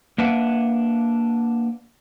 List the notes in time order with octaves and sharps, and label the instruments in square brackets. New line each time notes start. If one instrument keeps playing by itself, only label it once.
[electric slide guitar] A#3 D4 B4 E5 F#5